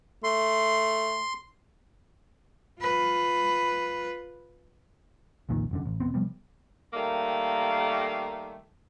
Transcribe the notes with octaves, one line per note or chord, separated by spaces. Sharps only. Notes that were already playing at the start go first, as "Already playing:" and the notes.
A3 C6
F4 B4
C2 F2 A#2 D#3
F1 F#2 D3
A1
E1 A#1 B3 C4
C3 F3 G3 B3
D#3 G3 A3 A#3